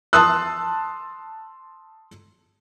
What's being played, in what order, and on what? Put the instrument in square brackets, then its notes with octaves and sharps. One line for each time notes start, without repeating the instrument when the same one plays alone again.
[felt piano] A5 C6 D#6 E6 F#6